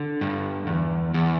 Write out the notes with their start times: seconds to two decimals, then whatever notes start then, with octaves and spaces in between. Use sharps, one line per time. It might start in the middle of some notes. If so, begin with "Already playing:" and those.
Already playing: D3
0.21 G2
0.67 E2
1.14 E2